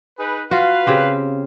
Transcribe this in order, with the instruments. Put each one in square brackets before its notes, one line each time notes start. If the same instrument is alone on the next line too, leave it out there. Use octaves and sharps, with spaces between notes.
[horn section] D#4 G#4 B4
[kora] F4 F#4 [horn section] B4 F5
[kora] C#3 C4 G4